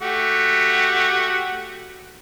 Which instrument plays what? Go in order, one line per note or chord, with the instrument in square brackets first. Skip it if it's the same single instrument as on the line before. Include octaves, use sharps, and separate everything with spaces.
[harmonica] A3 F#4 G4